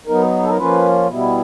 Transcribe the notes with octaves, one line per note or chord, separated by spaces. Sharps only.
F#3 B3 D#4 A#4
A4
A#4
F3 A#3 C#4 F4 B4
B2 G3 B3 E4